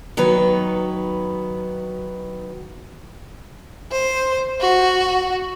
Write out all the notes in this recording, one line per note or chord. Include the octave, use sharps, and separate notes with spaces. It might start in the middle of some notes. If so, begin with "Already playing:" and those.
D#3 F#3 B3 B4
C5
F#4